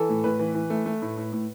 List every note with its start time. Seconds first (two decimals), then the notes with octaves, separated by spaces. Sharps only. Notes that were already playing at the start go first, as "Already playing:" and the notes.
Already playing: E3 A4
0.09 A2
0.24 A2 B4
0.39 E3
0.55 E3
0.70 A3
0.86 A3
1.02 A2
1.17 A2
1.33 A2